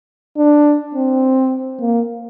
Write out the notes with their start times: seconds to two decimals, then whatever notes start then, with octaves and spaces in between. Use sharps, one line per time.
0.37 D4
0.95 C4
1.81 A#3